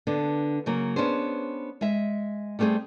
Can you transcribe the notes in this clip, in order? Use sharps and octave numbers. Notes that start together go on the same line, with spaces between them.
D3 B3 D4
C#3 F#3 A#3
B3 C#4 D4 G#4 C5
G#3 E5
G3 A3 B3 C4 G#4